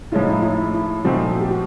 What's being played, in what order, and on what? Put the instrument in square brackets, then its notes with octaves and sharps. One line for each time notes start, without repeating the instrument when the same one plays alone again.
[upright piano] A2 F3 G#3 C#4 F4 [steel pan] E4
[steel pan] D#4
E4
E4
E4
[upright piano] A#2 F3 A3 C4 D#4 [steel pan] F#4
[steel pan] G4
F#4